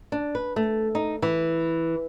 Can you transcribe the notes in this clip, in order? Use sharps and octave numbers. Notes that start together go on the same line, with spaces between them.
D4
B4
A3
D#4
E3